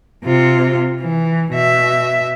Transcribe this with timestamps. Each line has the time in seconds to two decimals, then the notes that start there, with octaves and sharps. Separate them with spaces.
0.24 C3 F4
1.01 E3
1.52 B2 E5